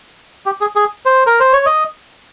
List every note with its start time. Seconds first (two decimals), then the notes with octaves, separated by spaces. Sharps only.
0.46 G4
0.61 G#4
0.76 G#4
1.06 C5
1.26 A#4
1.40 C5
1.53 C#5
1.66 D#5